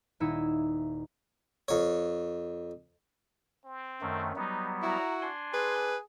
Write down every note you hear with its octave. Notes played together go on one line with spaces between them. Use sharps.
D#1 D#4 E4 G#4 E6 C#7
F2 C#5
C4
F#2 D#3 A3
F#3 G3 B3 D#4
E4 F#4 A#5
D4 G#5 C6
G#4 B4